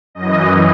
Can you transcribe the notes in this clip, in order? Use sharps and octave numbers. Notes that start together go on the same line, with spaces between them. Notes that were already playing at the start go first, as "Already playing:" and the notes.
F#2 D#5
E3